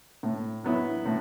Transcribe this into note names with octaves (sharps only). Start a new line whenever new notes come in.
A2
F#3 B3 E4
A2